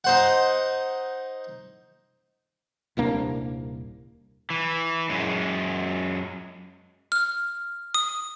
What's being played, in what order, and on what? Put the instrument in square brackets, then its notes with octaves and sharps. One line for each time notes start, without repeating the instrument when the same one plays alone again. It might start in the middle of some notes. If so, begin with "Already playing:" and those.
[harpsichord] D#4 C5 F#5
[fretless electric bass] D#1 C2 A#3 D4
[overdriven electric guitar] E3
F#2 G#3
[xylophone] F6
D#6